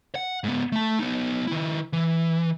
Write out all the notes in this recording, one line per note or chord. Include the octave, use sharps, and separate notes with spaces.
F#5
G#2 B3
A3 A5
B3 D#4
D#3 E4
E3